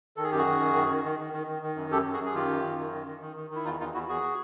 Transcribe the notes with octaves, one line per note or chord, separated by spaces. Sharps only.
D#3 A4
G#4
F#2 G4
F#4 G#4
D#3
F#2
D#3
D#3
D#3
D#3
D#3
D#3
D#3
F#2
F#2 G4 A4
F#2
F#4 G#4
F#2
G#4
D#3 F4 G4
F#2
D#3
F#2
D#3
D#3
D#3
D#3
D#3 E4
E2 D#4 F4
E2 D#4 F4
E2 E4 F#4
E2 F#4 G#4